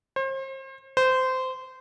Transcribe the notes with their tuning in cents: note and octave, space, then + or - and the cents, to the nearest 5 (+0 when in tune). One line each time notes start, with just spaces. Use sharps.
C5 +35
C5 -20